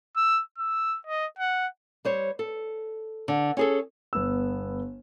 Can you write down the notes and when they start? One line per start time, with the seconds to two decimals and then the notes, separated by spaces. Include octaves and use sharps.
0.16 E6
0.58 E6
1.07 D#5
1.38 F#5
2.05 G3 C5 C#5
2.39 A4
3.28 D3
3.57 C#4 G#4 A4
4.13 G1 B3 E6